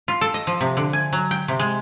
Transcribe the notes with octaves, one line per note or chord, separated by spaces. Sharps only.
F4
A4
D#5
F3
C3
D3
G#5
F#3
G5
C3
G#3